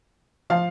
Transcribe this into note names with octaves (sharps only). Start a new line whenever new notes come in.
F3 F5